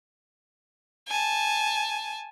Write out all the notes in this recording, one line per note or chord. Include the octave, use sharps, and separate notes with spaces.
G#5 A5